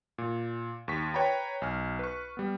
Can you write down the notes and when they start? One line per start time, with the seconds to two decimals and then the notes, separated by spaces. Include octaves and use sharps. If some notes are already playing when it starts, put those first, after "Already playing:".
0.18 A#2
0.88 D#2 C#6 B6
1.14 B4 C#5 G5 A#5 B5
1.62 B1 G#5 F6
1.99 B4 C#6
2.37 G3 B3